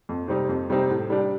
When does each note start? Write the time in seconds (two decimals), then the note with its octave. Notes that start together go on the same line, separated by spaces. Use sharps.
0.09 F2
0.28 C3 G3 C4 D#4
0.49 F2
0.70 C3 G3 C4 D#4
0.90 A2
1.10 G3 D4